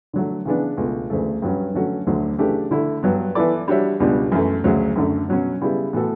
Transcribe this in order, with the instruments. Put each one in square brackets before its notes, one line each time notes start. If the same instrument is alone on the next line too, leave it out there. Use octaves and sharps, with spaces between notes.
[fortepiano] D3 F#3 A3
C#3 E3 B3 D4
C#2 B2 A3
D2 C#3 E3 A3
G2 F#3 C#4
D3 F#3 A3 C#4 F#4
D2 D3 F#3 A3
C#3 E3 A3 D4 G4
D3 A3 E4
G2 F#3 B3
E3 B3 E4 A4 D5
G3 D4 F#4 C#5 E5
C#2 B2 G3 D4
F#2 E3 A3
D2 C#3 F#3
F#2 D3 A3
B2 F#3 C#4
C#3 G3 B3 E4
A2 E3 B3 F#4 A4